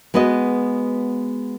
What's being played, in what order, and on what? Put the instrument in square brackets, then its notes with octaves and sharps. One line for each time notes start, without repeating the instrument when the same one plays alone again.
[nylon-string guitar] G#3 B3 F#4 B4 D#5